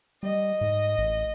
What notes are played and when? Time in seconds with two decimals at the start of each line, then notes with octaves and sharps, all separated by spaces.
0.23 G3 D#5
0.61 G#2
0.98 A1